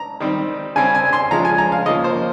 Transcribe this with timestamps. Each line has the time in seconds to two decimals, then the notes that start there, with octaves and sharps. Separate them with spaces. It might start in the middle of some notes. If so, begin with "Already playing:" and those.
Already playing: A#5
0.20 D#3 G3 C4
0.76 C#3 G3 C4 G#5
0.95 G#5
1.13 C6
1.31 C#3 F3 G#3 A#5
1.45 G#5
1.58 A#5
1.72 F5
1.86 C#3 F3 A#3 D#5
2.04 C5